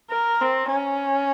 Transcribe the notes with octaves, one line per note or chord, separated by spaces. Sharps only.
A#4
C4
C#4